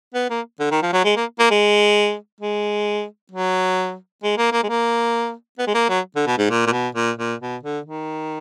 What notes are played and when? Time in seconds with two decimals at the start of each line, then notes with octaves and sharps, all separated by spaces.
0.14 B3
0.30 A#3
0.59 D3
0.71 D#3
0.82 F3
0.93 F#3
1.04 G#3
1.16 A#3
1.39 A#3
1.51 G#3
2.41 G#3
3.32 F#3
4.23 G#3
4.38 A#3
4.52 A#3
4.63 G#3
4.69 A#3
5.58 B3
5.67 G#3
5.74 A#3
5.89 F#3
6.16 D3
6.27 B2
6.38 G#2
6.50 A#2
6.67 A#2
6.72 B2
6.95 A#2
7.18 A#2
7.41 B2
7.63 D3
7.86 D#3